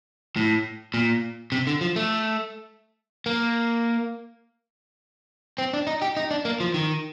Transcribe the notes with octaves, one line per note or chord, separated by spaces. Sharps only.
A2
A#2
C3
D3
F3
A3
A#3
C4
D4
D#4
G4
D#4
D4
A#3
F3
D#3